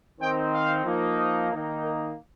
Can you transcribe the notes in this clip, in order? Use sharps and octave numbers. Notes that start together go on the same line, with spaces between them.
D#3 C4 D#4 G5
F5
F3 A#3 D#4
D#5
D#3 A#3 D#4
A#4